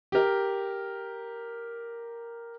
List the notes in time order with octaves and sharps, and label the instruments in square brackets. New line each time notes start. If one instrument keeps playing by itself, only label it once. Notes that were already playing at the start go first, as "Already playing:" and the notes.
[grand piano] G4 A#4